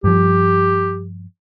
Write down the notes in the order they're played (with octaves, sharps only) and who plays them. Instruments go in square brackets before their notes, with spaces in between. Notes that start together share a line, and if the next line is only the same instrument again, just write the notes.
[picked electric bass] G2 F3 [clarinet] G4